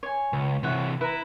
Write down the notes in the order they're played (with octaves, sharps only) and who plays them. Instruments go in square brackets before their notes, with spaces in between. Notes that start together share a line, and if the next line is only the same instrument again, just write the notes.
[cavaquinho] C#5 G#5
[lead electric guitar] C#2 [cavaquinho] C#5
[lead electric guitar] C3 E3 [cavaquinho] C#5 E5 F#5
[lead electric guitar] E4 [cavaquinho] B4 A#5